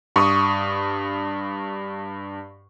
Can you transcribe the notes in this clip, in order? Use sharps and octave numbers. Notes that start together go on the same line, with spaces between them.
G2 C#6 D#6